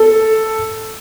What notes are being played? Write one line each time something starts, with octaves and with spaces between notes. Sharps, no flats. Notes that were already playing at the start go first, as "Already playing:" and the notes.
Already playing: A4